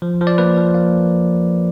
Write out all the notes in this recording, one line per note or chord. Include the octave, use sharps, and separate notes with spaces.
F3
F3
D5
A#3 B4
F3
A#3